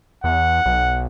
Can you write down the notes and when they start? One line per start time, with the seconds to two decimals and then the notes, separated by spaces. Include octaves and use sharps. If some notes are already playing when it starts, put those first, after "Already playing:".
0.24 E2 F#5
0.66 B1